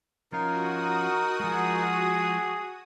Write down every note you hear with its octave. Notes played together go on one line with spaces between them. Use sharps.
F3 C#4 D#4 F4 F#4 A#4 D#6
F3 G#3 G#4